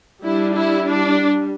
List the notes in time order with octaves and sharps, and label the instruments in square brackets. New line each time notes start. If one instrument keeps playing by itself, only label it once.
[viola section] G3 D4 E4
E4
D4